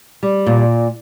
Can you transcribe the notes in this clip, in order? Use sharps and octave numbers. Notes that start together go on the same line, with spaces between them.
G3
A#2